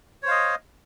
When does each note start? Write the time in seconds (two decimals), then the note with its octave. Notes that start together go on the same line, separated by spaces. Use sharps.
0.23 C#5
0.25 C5
0.28 F5
0.31 D#5